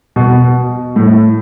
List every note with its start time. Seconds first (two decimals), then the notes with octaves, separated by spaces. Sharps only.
0.16 B2
0.96 A2